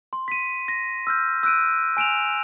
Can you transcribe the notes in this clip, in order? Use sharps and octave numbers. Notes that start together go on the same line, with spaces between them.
C6
B6 D#7
A#6
E6 F6 G6
E6 F#6 D7 D#7
G#5 D7 E7 F7